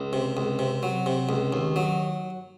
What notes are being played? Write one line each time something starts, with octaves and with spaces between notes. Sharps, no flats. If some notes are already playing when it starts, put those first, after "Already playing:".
Already playing: C#2
C3
C#2
C3
F#3
C3
C#2
D#2
F#3